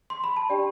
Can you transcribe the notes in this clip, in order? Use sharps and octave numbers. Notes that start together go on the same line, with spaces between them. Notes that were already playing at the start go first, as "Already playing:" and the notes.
C6
B5
A5
D4 G4 D5 G5